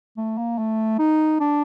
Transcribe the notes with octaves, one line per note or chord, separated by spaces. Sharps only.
A3
A#3
A3
D#4
D4